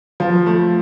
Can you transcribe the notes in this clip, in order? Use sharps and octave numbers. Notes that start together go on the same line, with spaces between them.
F3
A3